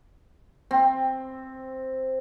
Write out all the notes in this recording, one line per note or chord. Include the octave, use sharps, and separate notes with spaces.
C4